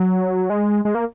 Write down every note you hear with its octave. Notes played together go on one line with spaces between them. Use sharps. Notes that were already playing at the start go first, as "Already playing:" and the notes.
Already playing: F#3
G#3
G#3
A#3